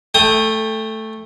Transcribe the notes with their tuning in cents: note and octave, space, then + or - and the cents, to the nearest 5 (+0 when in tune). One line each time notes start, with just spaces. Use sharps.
A3 +0 G5 +30 D#6 +0